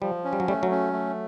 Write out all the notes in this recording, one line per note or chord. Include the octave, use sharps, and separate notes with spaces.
F3 G3
C#4
G3
F#3
G3 A3
F#3
C#4
A3